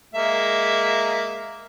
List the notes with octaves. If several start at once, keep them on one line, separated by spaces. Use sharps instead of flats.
G#3 A#3 E5